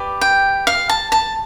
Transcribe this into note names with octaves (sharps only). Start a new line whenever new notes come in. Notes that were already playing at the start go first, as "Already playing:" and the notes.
Already playing: G4 B4 D5
G5
F5
A5
A5